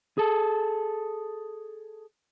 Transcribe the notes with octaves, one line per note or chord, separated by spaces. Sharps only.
G#4 A4